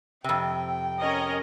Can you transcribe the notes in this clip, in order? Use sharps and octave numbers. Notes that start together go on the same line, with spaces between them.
F2 C3 G5
C#4 A#4 D#5